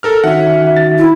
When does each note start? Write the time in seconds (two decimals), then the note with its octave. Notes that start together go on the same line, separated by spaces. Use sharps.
0.03 A4 A#4 F6
0.24 D#3 C#4 F#4 E5 F#5
0.65 E5
0.77 A6
0.98 E4